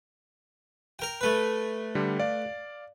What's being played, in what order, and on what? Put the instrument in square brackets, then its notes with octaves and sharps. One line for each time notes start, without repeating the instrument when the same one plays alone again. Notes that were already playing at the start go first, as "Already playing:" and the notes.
[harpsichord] A#4 G5
A3 B4
[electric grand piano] D3 G3
D5 F5